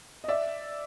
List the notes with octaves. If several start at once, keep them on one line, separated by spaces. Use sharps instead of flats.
D#5
D5 E5